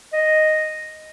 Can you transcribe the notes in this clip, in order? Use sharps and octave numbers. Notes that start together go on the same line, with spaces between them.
D#5